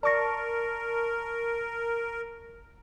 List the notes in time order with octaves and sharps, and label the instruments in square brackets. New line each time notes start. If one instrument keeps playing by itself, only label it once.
[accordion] A#4 [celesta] D5 A#6 [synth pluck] A5 C#6